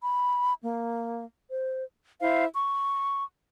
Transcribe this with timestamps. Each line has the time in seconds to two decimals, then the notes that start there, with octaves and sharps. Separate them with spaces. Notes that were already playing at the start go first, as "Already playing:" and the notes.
0.02 B5
0.63 A#3
1.50 C5
2.21 E4 C5 E5 F5
2.54 C#6